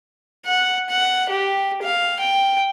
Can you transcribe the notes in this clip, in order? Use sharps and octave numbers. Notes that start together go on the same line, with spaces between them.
F#5
F#5
G4
F5
G5